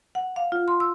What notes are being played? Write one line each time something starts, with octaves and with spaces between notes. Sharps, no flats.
F#5
F5
F4
C6
E6